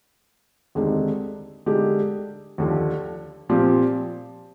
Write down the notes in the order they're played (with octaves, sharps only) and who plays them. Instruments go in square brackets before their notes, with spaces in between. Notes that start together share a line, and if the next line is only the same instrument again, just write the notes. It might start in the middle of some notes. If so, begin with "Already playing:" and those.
[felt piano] D#2 D3 G#3 C4 D#4
D3 G#3 D#4 G4
D#2 D3 F3
A#2 F3 C4 G4